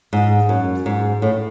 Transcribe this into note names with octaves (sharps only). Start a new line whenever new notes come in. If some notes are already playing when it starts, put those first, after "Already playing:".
G#2
F#2
G#2
A2